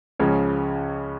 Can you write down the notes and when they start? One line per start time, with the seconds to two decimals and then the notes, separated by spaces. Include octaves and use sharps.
0.19 C#2 C#3 F3 C#4 C#5